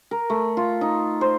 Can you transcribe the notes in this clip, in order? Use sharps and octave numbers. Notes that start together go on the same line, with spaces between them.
A#4
A3
F4
D#4
C5